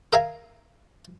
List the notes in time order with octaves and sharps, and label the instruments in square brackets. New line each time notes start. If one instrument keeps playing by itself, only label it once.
[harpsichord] A#4 E5 F5 G#5